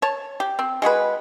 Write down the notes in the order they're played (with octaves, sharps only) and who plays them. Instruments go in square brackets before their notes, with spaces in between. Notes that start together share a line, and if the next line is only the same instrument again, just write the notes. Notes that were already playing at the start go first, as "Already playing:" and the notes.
[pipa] C#5 A5
G4
C4
G#3 F#4 G#4 B4